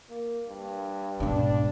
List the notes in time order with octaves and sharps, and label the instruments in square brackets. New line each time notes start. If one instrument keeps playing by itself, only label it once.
[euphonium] A#3
G2
[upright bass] G#2 B2 [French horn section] D4